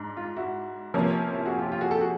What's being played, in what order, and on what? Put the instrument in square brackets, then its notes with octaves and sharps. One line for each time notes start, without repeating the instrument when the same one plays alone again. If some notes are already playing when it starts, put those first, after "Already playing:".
Already playing: [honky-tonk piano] G#2 D4
[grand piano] F4
E4 F#4
[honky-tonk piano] C3 F3 A#3 C#4
[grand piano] E4
F#4 G#4
F4 G4
F4 G4
F#4 G#4
G4 A4
F#4 G#4